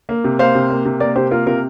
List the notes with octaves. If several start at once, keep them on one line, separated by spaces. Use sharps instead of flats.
A#3
C3
A#3 C5 F5
C3
A#3
C3
A#3 A#4 D5
C3 G4 C5
A#3 F4 A#4
C3 F4 A#4